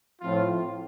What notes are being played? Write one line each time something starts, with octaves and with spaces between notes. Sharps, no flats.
A2 F3 C4 F4